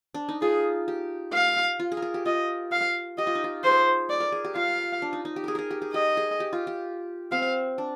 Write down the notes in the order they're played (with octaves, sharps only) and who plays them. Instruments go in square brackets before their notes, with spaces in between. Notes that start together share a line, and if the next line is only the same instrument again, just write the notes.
[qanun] D4
D#4
[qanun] F4 [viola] G#4
[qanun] G4
[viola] F5
[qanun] F4
G#4
A#4
G#4
G4
[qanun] F4 [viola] D#5
[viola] F5
[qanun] G4 [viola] D#5
[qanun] F4
D#4
F4
[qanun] G#4 [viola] C5
[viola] D5
[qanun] A#4
G#4
G4
[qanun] F4 [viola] F5
[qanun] D4
D#4
D#4
G4
G#4 A#4
G#4 A#4
G4
G#4
[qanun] G4 [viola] D#5
[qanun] G#4
G4
F4
G4
[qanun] C4 [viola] F5
[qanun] D4